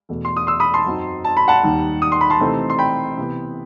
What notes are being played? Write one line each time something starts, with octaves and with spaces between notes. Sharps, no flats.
E2 B2 A3
C6
D#6
C6 E6
B5 D#6
A5 C6
F#2 F#3 C4 D#4
A5
B5
F#5 A5
D#2 D#3 G3 D#4
D#6
C6
B5
A5 C6
C3 E3 A3 C4 D#4
C6
G5 B5
C3 E3 B3